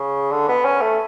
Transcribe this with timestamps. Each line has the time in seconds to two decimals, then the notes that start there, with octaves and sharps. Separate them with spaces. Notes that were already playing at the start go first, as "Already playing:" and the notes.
Already playing: C#3
0.32 D3
0.49 B3
0.65 C#4
0.81 A3